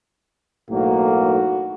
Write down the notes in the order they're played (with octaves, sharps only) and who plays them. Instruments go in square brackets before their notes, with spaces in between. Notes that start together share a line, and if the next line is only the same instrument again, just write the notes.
[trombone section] B1 A2 A#3 [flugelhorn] F#4